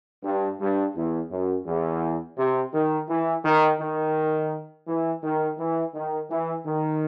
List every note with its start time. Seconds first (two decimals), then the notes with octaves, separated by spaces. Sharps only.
0.24 G2
0.60 G2
0.96 E2
1.31 F#2
1.67 E2
2.38 C3
2.74 D#3
3.09 E3
3.45 D#3
3.81 D#3
4.88 E3
5.23 D#3
5.59 E3
5.95 D#3
6.30 E3
6.66 D#3